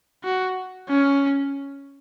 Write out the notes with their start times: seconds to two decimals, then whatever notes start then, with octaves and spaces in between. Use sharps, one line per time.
0.24 F#4
0.89 C#4